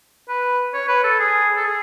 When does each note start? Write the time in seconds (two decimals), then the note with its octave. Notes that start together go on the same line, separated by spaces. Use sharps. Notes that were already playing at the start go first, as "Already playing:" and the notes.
0.29 B4
0.74 C#5
0.88 B4
1.04 A4
1.19 G#4
1.57 A4
1.64 G#4